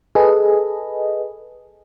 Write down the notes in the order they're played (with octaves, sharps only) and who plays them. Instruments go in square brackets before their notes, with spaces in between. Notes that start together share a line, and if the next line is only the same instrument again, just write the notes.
[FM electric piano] G#4 A4 B4 D#5